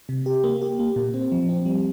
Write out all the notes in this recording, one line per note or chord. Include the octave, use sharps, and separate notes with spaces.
C3
G4
A#3
G4
A#3
A#2
C4
F3
C4
G3